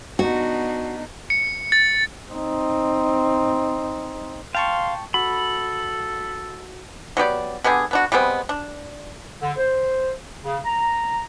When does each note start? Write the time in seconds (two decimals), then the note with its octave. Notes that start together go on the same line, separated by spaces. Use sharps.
0.19 B3 D4 D#4 F#4
1.30 C#7
1.72 A6
2.32 C4 D#4
4.55 F5 G5 A5 C6 C#6
5.14 F#4 A4 B5
7.17 F#3 B3 G4 D5
7.64 D3 B3 G4 G#4
7.91 B3 D4 F#4
8.12 G3 G#3 B3 C4
8.49 D4
9.41 D3
9.57 C5
10.44 C#3
10.65 A#5